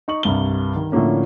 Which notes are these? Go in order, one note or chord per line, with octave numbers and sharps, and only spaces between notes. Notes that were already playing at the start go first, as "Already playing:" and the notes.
D#4 C#6 F#7
C2 G2 G7
D#3
A2 D3 F3 A#3 C#4